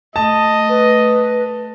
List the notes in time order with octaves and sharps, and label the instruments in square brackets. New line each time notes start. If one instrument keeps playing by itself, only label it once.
[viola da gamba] A3 [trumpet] D#5 [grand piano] A5
[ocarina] B4